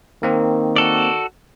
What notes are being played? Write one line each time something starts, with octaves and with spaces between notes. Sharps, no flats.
D#3 A#3 C4
F#4 A4 D5